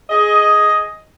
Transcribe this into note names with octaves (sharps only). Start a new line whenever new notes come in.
G#4 D#5